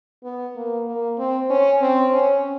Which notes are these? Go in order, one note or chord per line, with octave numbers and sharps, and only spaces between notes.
B3
A#3
A#3
C4
C#4
C4
C#4